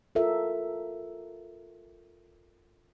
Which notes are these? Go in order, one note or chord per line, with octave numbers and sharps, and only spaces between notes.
F4 A4 A#4 E5